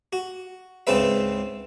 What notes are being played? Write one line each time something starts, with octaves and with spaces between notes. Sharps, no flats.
F#4
C#2 G#2 C#3 C4 B4 E5